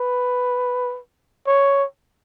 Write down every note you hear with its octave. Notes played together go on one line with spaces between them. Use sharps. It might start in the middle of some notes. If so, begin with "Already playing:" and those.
Already playing: B4
C#5